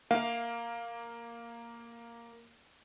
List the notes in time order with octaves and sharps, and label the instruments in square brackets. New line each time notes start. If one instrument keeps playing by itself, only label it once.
[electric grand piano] A#3 [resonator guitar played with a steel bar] F5